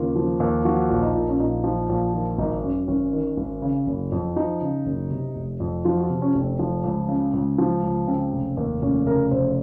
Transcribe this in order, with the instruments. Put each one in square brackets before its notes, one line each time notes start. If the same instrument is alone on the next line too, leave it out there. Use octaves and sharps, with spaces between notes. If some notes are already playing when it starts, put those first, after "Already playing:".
Already playing: [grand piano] D#2 C#3 F4
F3
D#2
F3 F#4
A#1
D#4
A#2
C#4
A#1 D#4
F3
A#1
D#3 F4
G#1 D#4
F#2 C#4
G#1 C#4
D#3
G#1
C#3
F#1
F2
F3 D#4
C#3
F#1
C3
F1
F2
F3 F4
F#4
F4
C3
C#4
F1
C4
F3
C#2
C#3
C#2
F3
C#2
C#3 C4
F1
D#2
F1 C#4
C#3 A#4
F1 C5